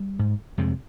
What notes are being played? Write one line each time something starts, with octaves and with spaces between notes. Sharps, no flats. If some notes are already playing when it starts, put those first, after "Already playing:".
Already playing: G3
G#2
F2 C3 G#3